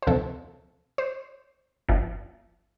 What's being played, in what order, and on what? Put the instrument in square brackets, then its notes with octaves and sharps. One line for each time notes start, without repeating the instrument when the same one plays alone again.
[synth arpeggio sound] C5
D2 C3 F3 A4
C5
G1 G2 F3